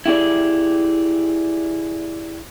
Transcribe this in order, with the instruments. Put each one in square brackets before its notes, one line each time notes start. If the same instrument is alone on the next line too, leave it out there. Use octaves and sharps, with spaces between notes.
[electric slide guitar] E4 G4 G#4 D5